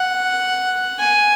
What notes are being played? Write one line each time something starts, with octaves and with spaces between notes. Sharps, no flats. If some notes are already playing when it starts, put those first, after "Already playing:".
Already playing: F#5
G#5